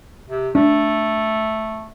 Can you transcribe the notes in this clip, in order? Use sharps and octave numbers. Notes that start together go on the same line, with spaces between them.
C3
A3 D4